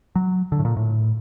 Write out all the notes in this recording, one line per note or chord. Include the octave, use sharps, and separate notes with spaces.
F#3
D3
A2
A#2
A2